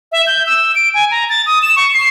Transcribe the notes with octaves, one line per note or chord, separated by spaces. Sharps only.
E5
G6
E6
D7
G#5
A#5
A6
D#6
E7
C#6
C7